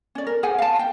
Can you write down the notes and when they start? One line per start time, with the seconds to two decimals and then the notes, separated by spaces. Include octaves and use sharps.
0.15 C#4 D5
0.27 A#4
0.43 G#4 C5 F#5 G#5
0.58 F5 A5
0.76 F5 G5